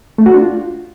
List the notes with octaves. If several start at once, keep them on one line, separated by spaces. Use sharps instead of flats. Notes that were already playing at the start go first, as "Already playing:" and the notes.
A3
F#4
D4
F4